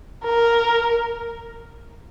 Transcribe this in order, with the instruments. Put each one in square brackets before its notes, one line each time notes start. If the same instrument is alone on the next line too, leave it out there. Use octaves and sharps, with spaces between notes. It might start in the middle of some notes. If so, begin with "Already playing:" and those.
[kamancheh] A#4